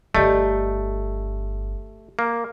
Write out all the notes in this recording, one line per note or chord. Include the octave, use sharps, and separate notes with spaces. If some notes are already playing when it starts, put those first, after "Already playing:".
G1 D3 A3 G4 D5 D#5
A#3